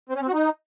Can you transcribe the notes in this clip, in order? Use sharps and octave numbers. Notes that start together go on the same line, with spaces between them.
C4
C#4
C4
F#4
D#4